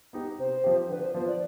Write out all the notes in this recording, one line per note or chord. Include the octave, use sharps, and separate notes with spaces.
B3 D#4 G4
C3 C5
F3 C4 G4
D3 B4
C5
F3 B3 F4 B4 C5
D5